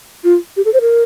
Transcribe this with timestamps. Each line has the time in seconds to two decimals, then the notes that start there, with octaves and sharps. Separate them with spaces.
0.24 F4
0.57 G4
0.65 A4
0.74 C5
0.81 A#4